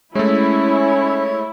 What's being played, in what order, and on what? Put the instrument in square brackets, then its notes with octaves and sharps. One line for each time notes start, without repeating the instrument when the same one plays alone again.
[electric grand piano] G#3 A3 [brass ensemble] C#4 [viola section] E4 [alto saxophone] C#5